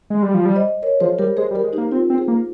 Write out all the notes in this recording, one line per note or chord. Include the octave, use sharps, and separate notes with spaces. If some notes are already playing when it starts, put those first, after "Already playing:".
G#3
G3
F3
G3
C5 D#5
A#4 C#5
F3 G#4 C5
G3 G4 A#4
G#3 G#4 C5
G3
G4 A#4
G#3
A#3 D#4 G4
C4 F4
C4
G#4 C5
A#3